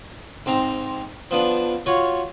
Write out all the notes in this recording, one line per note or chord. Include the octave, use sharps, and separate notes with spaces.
G#2 C4 A#5
F3 B3 D4
F4 F#4 C#5